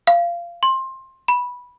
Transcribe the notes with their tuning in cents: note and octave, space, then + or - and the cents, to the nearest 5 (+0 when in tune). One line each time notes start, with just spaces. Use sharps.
F5 -20
C6 +20
B5 -10